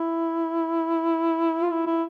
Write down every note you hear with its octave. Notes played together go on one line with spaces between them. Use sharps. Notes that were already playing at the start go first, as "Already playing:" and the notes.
Already playing: E4
F4
E4
E4